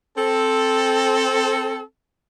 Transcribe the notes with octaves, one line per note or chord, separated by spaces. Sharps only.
C4 A4